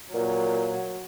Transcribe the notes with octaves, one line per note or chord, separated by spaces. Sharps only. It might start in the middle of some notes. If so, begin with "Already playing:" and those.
A#2 F#3